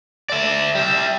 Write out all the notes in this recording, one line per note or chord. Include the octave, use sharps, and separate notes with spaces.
D5 E5
G3 E5